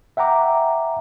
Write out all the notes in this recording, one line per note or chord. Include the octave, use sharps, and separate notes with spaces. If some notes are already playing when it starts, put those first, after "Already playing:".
E5 F#5 G5 A#5 D6